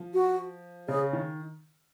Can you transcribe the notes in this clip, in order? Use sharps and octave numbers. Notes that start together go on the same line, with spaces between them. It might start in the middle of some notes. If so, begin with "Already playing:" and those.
Already playing: F3
F#4
C#3 G#4
D#3